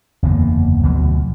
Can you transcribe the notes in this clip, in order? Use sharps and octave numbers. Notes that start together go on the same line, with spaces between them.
F#1 E2 D3 A#3
D2 B2 F3 F#3